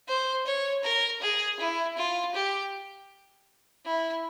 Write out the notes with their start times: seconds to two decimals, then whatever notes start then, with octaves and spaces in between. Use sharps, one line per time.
0.09 C5
0.46 C#5
0.84 A#4
1.22 G#4
1.60 E4
1.98 F4
2.35 G4
3.85 E4